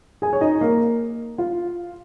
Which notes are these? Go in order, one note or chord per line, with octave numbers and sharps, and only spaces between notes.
G#4 G#5
C#5
D#4 D#5
A#3 A#4
F4